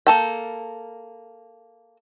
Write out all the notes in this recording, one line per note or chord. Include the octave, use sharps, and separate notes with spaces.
A#3 A4 G5